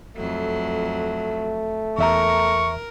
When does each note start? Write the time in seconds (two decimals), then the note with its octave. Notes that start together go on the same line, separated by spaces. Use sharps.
0.17 F2 F#3 A3
1.98 E2 A#4 E5 A#5 C#6